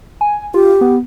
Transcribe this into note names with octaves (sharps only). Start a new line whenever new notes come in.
G#5
F4 G4
B3